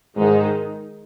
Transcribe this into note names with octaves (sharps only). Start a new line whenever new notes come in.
G#2 D#3 G#3 D#4